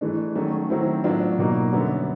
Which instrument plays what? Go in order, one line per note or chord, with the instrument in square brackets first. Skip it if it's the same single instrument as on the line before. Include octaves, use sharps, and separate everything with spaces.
[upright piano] G#2 E3 A3 D4
D#3 F#3 A3 C#4 F#4
D#3 F#3 A3 C4 E4
A2 F#3 B3 D4 F4
B2 F#3 A#3 D#4
F#2 D3 G3 B3